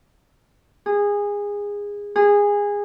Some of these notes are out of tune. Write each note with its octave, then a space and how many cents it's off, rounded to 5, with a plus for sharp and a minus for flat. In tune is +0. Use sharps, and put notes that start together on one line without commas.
G#4 -20
G#4 -20